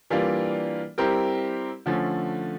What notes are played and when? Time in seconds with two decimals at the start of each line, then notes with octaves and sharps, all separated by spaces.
0.10 E3 G3 A#3 D4 F4
0.98 G3 C4 E4 G4 A#4
1.86 D3 F3 A3 C#4